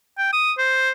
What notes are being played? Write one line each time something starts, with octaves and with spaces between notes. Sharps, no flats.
G5
D#6
C5